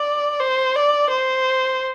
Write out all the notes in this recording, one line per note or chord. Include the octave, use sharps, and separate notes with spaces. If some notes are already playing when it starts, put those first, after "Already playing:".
Already playing: D5
C5
D5
C5